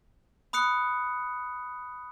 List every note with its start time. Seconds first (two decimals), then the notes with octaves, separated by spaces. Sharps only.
0.53 B5 D#6 F#6 C#7